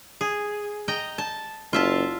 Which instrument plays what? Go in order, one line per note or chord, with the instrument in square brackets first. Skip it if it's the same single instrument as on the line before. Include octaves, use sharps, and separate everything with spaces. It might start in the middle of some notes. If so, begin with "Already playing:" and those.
[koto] G#4
D#5 G5 A#5
A5
[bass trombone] F#1 [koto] F4 E5 A5